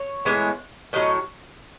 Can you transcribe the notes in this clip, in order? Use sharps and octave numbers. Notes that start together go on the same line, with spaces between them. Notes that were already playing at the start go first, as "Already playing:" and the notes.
Already playing: C#5
A2 E3 G#3 B3
A2 F#3 C#4 D#5